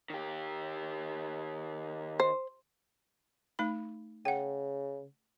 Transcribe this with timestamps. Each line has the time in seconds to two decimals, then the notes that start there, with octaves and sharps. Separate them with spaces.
0.10 D#3 G4
2.20 C5
3.59 A3 D#4 B5
4.25 C#3 F#5 G5